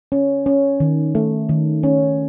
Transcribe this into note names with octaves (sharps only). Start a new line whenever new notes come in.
C#4
C#4
D#3
A3
D#3
C#4